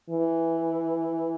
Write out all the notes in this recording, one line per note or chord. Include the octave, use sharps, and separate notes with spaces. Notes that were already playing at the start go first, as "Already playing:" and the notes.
E3